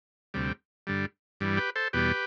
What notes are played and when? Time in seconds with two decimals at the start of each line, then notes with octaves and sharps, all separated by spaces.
0.34 D2 C3 G3
0.87 G2 D3 G3
1.41 G2 E3 G3
1.57 G4 B4
1.76 A4 C5
1.93 E2 B2 G3 G4 B4